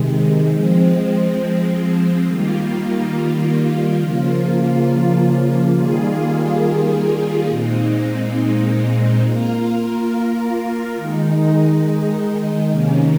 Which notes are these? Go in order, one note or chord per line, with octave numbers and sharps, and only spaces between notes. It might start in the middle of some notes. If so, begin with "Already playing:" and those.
Already playing: C3 D#3 G#3
F3 G#3 C4
D#3 G3 A#3 F4
C#3 F3 A#3 F4
D#3 G3 A#3 F4 G#4
A#2 G#3 C4 D#4
A#3 F4 A#4
D#3 G#3 D#4
C3 D#3 A#3 C#4